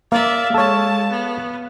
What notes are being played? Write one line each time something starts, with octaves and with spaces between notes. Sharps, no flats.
A#3 D5 E5 F5
G#3 A4 C#5 A5
B3